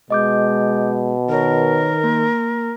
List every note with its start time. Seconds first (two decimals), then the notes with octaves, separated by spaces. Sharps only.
0.10 B2 G#3 D#5 D6 G6
1.29 D#3 A#4 B4 C#5
2.04 A#3